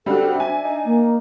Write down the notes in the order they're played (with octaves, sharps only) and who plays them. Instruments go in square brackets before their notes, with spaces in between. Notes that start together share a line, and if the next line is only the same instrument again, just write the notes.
[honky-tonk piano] G3 D4 F#4 [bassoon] C4 [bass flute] A4
[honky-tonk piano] D4 G#5 [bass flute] E5
[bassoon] D#4
[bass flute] A#3